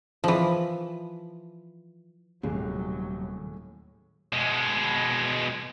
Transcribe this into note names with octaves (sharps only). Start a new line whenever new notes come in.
E3 F3
D#1 D#2 A2 C3 F#3 G#4 G#5
B2 G#3